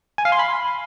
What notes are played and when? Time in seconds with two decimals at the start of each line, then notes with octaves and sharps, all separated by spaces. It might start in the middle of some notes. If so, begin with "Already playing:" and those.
0.18 G#5
0.25 F5
0.32 C6
0.39 B5